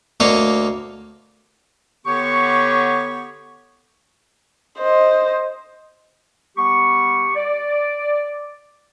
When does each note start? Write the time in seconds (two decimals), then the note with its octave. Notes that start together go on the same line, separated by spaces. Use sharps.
0.20 D2 A#3 C#5 D#5 F5
2.06 D3 B3 G4 C#5 C#6
4.78 C5 D#5
6.57 G3 B3 G4 C#6
7.36 D5